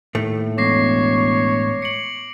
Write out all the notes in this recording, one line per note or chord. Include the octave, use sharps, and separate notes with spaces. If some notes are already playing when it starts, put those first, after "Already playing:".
D#2 A2 A3
E1 C#5 D6 A#6 C7
C#7 D7 F#7